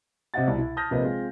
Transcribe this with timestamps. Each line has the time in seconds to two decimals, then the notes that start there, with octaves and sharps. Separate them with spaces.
0.34 C3 C4 D#5 E5 F#5 A6
0.47 C2 B2
0.58 E4
0.77 A5 D#6 F6 G6 A#6
0.91 A#1 C3 A#3 B4 D#5
1.03 G#3 C4 F4